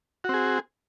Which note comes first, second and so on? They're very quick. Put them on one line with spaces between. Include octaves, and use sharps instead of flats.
F#4 C4 G#4